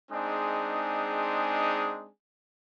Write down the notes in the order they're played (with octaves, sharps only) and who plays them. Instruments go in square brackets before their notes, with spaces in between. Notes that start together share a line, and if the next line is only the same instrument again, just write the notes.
[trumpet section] G#3 C4 D4 D#4 G#4